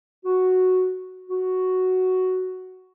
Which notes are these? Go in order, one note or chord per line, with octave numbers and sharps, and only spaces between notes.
F#4
F#4